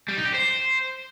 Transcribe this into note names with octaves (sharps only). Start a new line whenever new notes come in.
G3
D#4
G4
C5